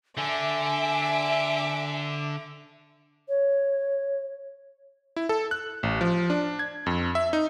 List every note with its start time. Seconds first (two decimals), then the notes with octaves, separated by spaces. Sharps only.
0.17 D3 E5 G#5 D6
3.29 C#5
5.16 E4
5.29 A4
5.51 F#6
5.83 A1
6.01 F3
6.30 D4
6.59 G#6
6.86 F2
7.15 E5
7.33 D#4